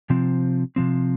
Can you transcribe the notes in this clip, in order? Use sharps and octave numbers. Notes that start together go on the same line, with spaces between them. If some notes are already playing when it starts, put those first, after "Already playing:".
C3 F3 C4
C3 F3 C4